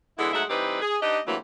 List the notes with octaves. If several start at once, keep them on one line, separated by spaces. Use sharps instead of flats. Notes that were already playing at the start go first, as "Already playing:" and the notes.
D3 E3 G#3 B3 E4
G#2 F#3 G#3 A3 E5 F#5
E3 G3 C4 D#4 G4 B4
G#4
D4 D#4 G4 B4 D#5
D2 C3 E3 F#3 A3 A#3